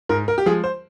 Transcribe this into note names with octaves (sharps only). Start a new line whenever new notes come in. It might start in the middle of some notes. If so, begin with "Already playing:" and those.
G#2 A#4
A#4
G4
F3 G#3 G#4
C5